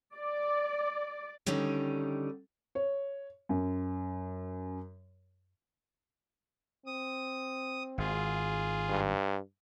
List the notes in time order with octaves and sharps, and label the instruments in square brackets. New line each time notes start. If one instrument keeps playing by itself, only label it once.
[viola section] D5
[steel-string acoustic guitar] D3 D#3 G3 C#4 D#4
[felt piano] C#5
F#2
[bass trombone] C4 [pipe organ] D#6
[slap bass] G#1 [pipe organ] F4 G#4
[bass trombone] G2